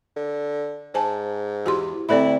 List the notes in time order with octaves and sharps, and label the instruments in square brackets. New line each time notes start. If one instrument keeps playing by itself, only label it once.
[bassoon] D3
[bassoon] G#2 [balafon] C5 G#5 A5
[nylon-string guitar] E2 [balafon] F#4 G4 C6
[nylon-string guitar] D2 D5 G5 [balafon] C4 A4 B5 [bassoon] E4